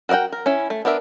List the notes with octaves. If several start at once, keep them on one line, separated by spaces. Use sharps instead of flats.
F#4 A#4 D#5 F#5 G5
A#4
C#4 E4
A3
B3 D4 A#4 E5